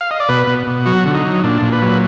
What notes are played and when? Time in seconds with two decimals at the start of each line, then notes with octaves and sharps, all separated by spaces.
0.01 F5
0.11 D#5
0.20 D5
0.29 B2 B4
0.47 B2
0.67 B2
0.86 F#3 F#4
1.06 D3
1.14 D#4
1.25 F#3
1.44 A#2 D4
1.62 A#2
1.72 B4
1.82 F#3